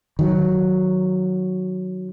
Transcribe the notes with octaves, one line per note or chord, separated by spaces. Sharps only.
D#3 F#3